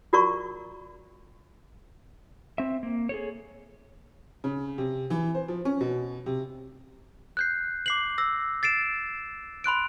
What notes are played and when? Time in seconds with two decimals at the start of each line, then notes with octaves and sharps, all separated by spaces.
0.13 F4 F#4 A#4 D5 A#5 C#6
2.58 C4 E5
2.83 A#3
3.09 G#4 A4 C#5
4.44 C#3
4.78 C3
5.10 E3
5.35 C5
5.48 F3
5.65 C#4
5.81 B2
6.26 C3
7.37 F#6 G6 C7
7.86 D6 C7 F#7
8.18 E6 A#6
8.63 A6 C7 D7 E7
9.64 B5 C6 F#6 D7